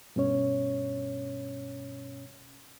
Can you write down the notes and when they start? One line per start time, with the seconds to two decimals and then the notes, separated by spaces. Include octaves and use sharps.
0.16 G2 B2 C#4 C#5